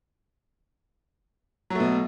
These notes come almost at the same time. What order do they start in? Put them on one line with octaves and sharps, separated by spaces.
F#3 A3 B2